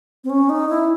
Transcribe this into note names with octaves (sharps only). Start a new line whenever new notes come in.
C4
C#4
D#4
E4